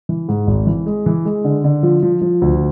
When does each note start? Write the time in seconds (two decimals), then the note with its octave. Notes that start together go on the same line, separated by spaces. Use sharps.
0.09 E3
0.28 G#2
0.47 G#1
0.67 E3
0.86 G#3
1.06 E3
1.25 G#3
1.44 D3
1.64 D3
1.83 F3
2.03 F3
2.21 F3
2.41 D2